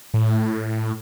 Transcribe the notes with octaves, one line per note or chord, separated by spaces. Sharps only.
A2